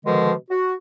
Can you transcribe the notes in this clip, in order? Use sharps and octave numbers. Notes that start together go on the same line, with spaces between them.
B2 D3 D#3 F3 G#3
F#4